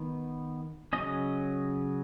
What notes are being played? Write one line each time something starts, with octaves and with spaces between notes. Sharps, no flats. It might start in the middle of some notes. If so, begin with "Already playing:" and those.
Already playing: D#3 B3
C#3 F#3 C#4 D#5